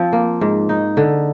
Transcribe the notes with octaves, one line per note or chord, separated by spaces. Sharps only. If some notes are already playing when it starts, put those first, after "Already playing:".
Already playing: F3 C4
A#3
G#2
D#4
D3